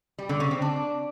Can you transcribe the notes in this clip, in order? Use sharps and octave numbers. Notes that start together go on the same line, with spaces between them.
G3
D3
C#3
C4
D4